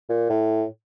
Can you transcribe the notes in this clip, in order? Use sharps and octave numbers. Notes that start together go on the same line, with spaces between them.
A#2
A2